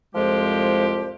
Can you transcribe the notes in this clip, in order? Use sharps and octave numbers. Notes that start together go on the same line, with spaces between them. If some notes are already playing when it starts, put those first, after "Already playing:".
C2 F2 F3 G#3 G4 C5